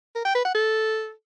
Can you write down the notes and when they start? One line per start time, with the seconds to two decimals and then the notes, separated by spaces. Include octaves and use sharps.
0.15 A#4
0.25 G5
0.35 B4
0.44 F#5
0.54 A4